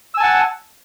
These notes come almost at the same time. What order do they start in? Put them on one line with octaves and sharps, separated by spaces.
E6 G#5 A5 F#5